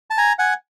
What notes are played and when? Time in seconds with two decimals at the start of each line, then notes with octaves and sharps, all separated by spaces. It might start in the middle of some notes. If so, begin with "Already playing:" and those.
0.10 A5
0.18 G#5 A#5
0.39 F#5 G#5